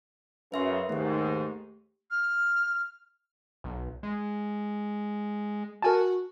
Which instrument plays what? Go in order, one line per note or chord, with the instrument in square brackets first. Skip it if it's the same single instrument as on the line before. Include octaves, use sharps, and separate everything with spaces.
[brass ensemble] F#2 C#3 [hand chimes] B4 E5 C6
[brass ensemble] D#2 G#2 [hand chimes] A3 G4
[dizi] F6
[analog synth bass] B1
G#3
[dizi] F#4 [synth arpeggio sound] A#4 G#5 A5